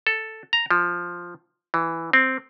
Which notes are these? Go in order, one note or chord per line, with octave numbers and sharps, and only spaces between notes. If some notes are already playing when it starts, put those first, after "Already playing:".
A4
A#5
F3
E3
C4